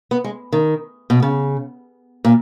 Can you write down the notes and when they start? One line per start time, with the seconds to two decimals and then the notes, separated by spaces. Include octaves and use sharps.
0.11 B3
0.24 G#3
0.53 D#3
1.10 B2
1.22 C#3
2.25 A#2